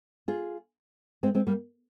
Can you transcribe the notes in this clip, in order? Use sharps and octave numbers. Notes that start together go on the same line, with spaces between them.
F4 G#4
G#3 C4
G#3 C4
G3 A#3